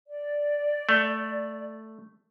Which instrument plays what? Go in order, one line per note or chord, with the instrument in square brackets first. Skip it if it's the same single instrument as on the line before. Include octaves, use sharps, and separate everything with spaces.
[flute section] D5
[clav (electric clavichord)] A3